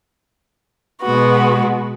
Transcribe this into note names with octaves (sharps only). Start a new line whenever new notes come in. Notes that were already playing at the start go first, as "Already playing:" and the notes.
B2 G#3 B3 F#4